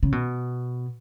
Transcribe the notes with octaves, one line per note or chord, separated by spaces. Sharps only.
C#3
B2